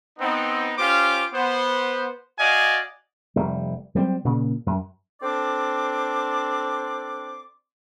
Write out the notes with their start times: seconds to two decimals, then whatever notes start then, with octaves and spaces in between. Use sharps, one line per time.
0.19 B3 C4 D#4
0.77 C#4 F4 G4 C5 F5 D6
1.33 B3 C5
2.39 F#4 D5 D#5 F5 G#5
3.36 F1 G3
3.95 F#3 G3 B3 C4
4.25 A#2 C#3
4.66 F#2
5.21 C4 D4 A4 D5 C6 D6